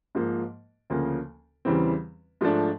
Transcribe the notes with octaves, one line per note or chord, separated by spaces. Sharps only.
G#2 F3 A#3
D2 C#3 F3 A#3
E2 C#3 E3 G3 C4
G#2 F3 A3 D4